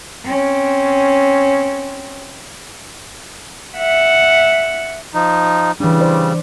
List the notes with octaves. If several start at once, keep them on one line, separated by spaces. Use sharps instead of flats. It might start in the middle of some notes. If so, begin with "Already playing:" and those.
C4 C#4
E5 F#5
F3 D#4
C#3 E3 G3 D4
C5 D5